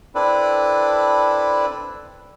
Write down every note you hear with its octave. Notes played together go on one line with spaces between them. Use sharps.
C4 D4 E4 A4 B4 D5